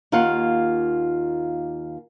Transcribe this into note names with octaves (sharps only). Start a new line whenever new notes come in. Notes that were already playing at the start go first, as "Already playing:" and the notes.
D#2 A#3 F4 F#5